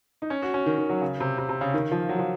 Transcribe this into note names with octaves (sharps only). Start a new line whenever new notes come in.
D#4
C#4
F#4
C#4
D#3
D#3
F#3
C#3
C3
C3
C3
C#3
D#3
F3
F#3
F3